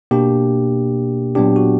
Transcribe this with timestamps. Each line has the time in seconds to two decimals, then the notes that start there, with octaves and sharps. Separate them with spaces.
0.11 B2 A#3 D4 G4
1.35 A#2 F#3 B3 D4 G4
1.56 F#4